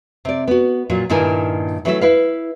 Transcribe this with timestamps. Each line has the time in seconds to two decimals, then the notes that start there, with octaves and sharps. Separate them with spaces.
0.25 C3 D5
0.48 B3 F#4
0.90 A#2 F#3 F4
1.10 G2 A#2 D#3 E4 A#4 G#5
1.85 E3 F#3 A3 E4 D#5 E5
2.01 E4 B4 F5